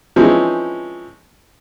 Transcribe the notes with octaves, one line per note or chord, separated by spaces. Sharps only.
E3 F3 G#3 C4 C#4 D#4